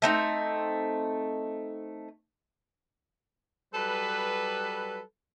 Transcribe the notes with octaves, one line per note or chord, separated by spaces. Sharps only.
A3 C4 D#4
F#3 G3 A4 B4